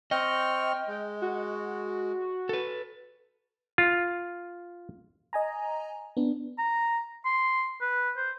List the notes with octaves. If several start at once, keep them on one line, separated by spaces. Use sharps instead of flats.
C4 D#5 G5 C#6 F6
G#3
F#4
A4 B4
F4
D#5 G#5 A#5
B3 D4
A#5
C6
B4
C5